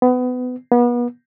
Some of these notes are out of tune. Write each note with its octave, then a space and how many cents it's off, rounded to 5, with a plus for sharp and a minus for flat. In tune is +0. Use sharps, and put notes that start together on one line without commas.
B3 +25
B3 -35